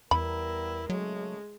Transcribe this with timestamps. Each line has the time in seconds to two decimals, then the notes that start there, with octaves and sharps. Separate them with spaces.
0.11 E2 G3 B3 E4 A#4 B5
0.90 F#2 C#3 F#3 G#3 A3